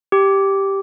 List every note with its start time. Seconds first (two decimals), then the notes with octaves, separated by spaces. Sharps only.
0.12 G4